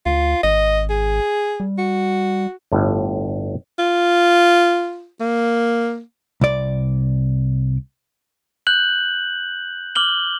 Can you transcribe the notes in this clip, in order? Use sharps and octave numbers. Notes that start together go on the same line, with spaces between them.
D2 F4
G#1 D#5
G#4
G3
F#4
G1 A2
F4
A#3
C2 D5
F#6 G6 F#7
D6 F6 F#7 G7